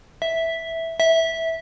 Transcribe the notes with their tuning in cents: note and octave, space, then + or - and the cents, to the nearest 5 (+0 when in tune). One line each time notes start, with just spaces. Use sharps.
E5 -5
E5 -15